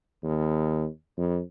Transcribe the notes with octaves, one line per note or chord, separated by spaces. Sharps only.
D#2
F2